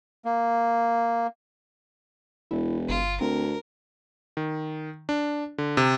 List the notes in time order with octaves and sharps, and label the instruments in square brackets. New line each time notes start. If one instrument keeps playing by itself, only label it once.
[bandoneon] A#3
[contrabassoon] E1 [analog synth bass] E4
[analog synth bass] G1 [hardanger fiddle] F4
[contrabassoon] D2 [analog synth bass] C4 [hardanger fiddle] A#4
[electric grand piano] D#3
D4
D3
C3